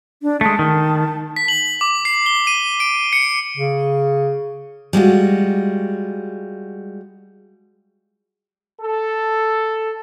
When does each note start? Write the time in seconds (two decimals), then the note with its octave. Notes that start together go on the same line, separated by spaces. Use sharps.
0.23 D4
0.41 G#3 A3 A5
0.59 D#3
1.36 B6
1.48 F#7
1.81 D6
2.05 C7
2.26 G7
2.47 D#7
2.80 D7
3.13 C#7
3.57 C#3
4.93 G3 G#3 F4 F#4
8.81 A4